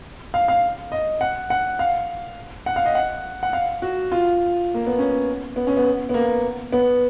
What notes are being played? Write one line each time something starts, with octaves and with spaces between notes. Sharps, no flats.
F5
F5
D#5
F#5
F#5
F5
F#5
F5
D#5
F#5
F#5
F5
F#4
F4
A#3
B3
C#4
B3
C#4
B3
B3
A#3
B3